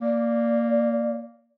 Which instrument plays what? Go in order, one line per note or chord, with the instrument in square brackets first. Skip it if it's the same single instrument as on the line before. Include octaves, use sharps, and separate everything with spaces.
[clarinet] A#3 [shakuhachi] D5